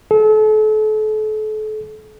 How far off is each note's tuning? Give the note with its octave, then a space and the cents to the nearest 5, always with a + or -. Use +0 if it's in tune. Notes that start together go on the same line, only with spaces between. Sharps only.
A4 -35